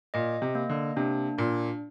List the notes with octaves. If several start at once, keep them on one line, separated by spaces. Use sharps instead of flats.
A#2 D#5
C3
A#3
D3
C3 D4
A#2 D4